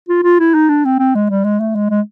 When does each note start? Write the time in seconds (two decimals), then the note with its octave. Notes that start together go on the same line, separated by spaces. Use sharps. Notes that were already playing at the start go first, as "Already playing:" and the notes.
0.09 F4
0.24 F4
0.40 E4
0.54 D#4
0.69 D4
0.85 C4
0.99 C4
1.15 G#3
1.30 G3
1.44 G#3
1.60 A3
1.75 G#3
1.90 G#3